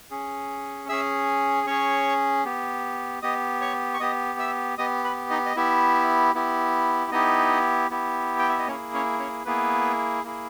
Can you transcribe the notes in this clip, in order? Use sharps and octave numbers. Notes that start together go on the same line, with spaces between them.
C#4 G#4
C#4 G#4 E5 E6
C#4 G#4 C#5 C#6
B3 G4
B3 G4 D#5 D#6
C#5 C#6
C#6
B3 G4 D#5 D#6
E5 E6
B3 G4 D#5 D#6
B4 B5
D#4 D#5
D#5
B3 E4 G4 E5
B3 E4 G4
B3 D#4 E4 G4 D#5
B3 E4 G4
G5
E5
D#5
A#3 C#4 E4 G#4 C#5
C#4 C#5
C#4 C#5
A#3 B3 E4 G#4 B4
A#3 E4 G#4